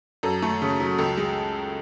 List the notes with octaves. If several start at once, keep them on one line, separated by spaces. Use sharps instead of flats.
F#2 A4
A3
C#3
F#3
C#2 A4
G#3